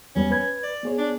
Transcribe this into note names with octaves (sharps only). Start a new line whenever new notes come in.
E2 G3 B3 C#4
B4 G#6
D5
B3 G#4 C#5
D4